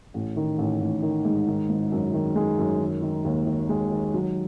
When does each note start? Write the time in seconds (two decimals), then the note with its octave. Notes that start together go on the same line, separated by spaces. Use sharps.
0.14 A1
0.36 D#3
0.58 A1
0.81 A1
1.02 D#3
1.25 G#2
1.48 D#3
1.69 G#1
1.92 F#2
2.14 D#3
2.35 G#3
2.59 F#2
2.80 D#3
3.02 D#3
3.24 D#2
3.46 D#3
3.69 G#3
3.92 D#3
4.14 F#3